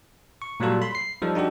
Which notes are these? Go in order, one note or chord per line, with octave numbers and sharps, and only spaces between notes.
C#6
A#2 F#3 G3 F4 A4
B5 C6
C7
F3 G3 D#4 A4
D4 D#4 F#4 G4 A4